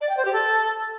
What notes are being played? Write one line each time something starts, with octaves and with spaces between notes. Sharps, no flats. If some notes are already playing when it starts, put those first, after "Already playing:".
D5
G5
C5
G4
A4